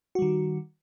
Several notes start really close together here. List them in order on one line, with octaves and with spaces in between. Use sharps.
F#4 G3 D#3